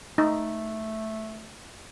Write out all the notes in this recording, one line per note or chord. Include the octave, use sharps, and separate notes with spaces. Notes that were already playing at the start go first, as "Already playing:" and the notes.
A3 D#4